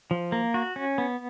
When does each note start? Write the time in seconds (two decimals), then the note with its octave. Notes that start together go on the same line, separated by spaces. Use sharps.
0.11 F3
0.32 A#3
0.54 F#4
0.76 C#4
0.98 B3